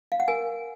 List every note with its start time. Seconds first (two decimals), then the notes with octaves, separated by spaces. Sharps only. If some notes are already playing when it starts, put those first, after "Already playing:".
0.12 F5
0.20 F#5
0.28 A#4 G#5